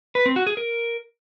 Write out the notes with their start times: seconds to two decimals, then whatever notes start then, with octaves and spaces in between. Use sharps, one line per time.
0.15 B4
0.26 C4
0.36 F#4
0.47 G#4
0.57 A#4